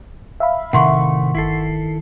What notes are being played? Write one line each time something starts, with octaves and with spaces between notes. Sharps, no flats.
E5 F5 B5
A2 C3 D#3 A3 F#5 C6 C#6
G1 E4 A4 C7